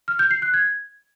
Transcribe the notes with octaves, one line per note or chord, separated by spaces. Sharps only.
F6
G6
C7
F#6
G#6